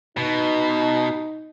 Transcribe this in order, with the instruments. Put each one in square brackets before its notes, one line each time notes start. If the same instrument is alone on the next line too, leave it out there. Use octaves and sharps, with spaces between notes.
[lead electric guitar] B2 [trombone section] D#4